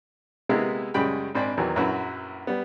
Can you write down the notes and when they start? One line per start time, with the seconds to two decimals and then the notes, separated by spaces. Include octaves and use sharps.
0.49 C3 G#3 A#3 B3 E4 G#4
0.94 F#2 C#3 G3 G#3 G5 B5
1.35 G#1 C4 D4 B5
1.57 E2 D#3 E3 F#3
1.76 A#1 F#2 F#3 E4 F#4 B4
2.47 G3 B3